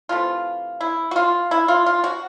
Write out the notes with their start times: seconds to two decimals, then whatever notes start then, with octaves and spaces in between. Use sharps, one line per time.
0.09 C3 E3 A3 F4
0.81 E4
1.11 F#4
1.16 F4
1.51 E4
1.68 F4
1.86 F4
2.04 F#4